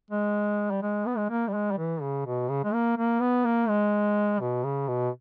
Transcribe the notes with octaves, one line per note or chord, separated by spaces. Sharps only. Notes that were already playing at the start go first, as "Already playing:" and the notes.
G#3
G3
G#3
B3
G#3
A#3
G3
G#3
G3
E3
C#3
B2
C#3
G#3
A#3
A#3
B3
A#3
G#3
B2
C#3
B2